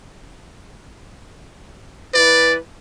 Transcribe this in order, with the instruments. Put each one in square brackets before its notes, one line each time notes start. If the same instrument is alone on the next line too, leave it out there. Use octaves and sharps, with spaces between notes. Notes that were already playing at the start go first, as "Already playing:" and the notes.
[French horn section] E3 E4 B4 [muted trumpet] D5